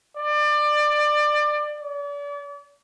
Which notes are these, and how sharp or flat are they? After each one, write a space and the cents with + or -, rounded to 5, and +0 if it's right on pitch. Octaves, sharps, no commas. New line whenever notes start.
D5 +25
D5 -40